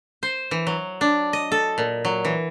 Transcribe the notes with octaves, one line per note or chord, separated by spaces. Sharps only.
C5
E3
F#3
D4
D#5
A4
A#2
F#3
E3